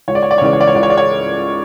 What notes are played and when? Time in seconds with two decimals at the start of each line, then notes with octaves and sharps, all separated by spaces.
0.08 C#2 C#5
0.15 D5
0.23 C#5
0.31 D5
0.38 C#5
0.41 C#3 E3 G#3 D5
0.53 C#5
0.61 D5
0.67 C#5
0.75 C#2 D5
0.83 C#5
0.90 D5
0.97 C#5